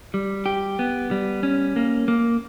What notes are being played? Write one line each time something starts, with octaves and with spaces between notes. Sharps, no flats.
G3
G4
B3
G3
C#4
A#3
A#3